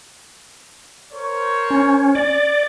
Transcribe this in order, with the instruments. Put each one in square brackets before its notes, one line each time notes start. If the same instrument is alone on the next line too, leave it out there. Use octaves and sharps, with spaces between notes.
[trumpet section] A#4 C5 C#5
[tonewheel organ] C#4
D5